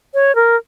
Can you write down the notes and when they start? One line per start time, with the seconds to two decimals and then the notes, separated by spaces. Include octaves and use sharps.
0.14 C#5
0.35 A#4